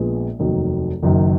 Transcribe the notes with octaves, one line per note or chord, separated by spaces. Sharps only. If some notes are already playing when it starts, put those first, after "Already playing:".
Already playing: A#1 A#2 G#3 B3
F1 D#2 D#3 F#3
F#1 F#2 D#3 F#3